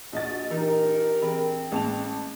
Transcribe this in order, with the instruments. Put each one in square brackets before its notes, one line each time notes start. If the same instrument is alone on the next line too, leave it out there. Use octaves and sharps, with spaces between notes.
[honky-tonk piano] A#1 D#5 A6 [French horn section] F#4
[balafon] E3 [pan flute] D#4 [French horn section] G4 A#4
[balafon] E3 G#4 B5 [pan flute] C4
[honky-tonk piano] A1 A5 F7 [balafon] G#3 A#3 G#4